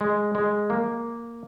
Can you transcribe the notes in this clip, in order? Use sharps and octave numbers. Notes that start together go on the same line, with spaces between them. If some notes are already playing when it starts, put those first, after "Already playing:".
G#3
G#3
A#3